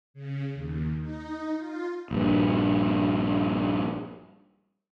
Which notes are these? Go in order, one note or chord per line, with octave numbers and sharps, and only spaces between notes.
C#3
D#2
D#4
F4
A#1 G2